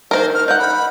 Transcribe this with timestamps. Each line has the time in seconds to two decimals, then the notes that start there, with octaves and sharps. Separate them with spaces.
0.11 D#3 A#3 A#4 C5
0.34 F6
0.48 D#4 F#5 G6
0.59 B5